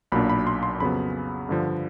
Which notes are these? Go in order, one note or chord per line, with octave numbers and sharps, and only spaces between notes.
B1 A#2 F#3 A#3 D4 B5
B5
C6
C6
F2 C#3 F#3 B3 B5
G2 D3 F3